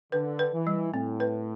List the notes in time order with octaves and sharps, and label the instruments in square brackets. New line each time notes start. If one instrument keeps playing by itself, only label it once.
[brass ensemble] D3 [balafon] B4
[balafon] B4
[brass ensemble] E3
[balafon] G3
[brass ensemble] A2 [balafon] C4
[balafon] B4